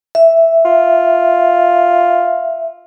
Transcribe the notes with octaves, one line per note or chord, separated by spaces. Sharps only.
E5
F4